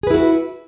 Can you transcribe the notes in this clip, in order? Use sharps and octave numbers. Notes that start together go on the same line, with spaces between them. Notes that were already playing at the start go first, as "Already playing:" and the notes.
E4 F#4 G#4 B4